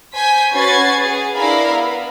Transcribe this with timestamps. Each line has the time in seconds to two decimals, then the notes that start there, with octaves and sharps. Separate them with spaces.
0.15 C5 G#5 G6 B6
0.53 C#4 F#4 B4 G#6 A6 C7
0.98 G#4
1.36 D4 E4 A#4 F5 B5
1.72 B3